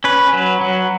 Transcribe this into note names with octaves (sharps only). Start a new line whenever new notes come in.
C#4 B4
F#3
F#3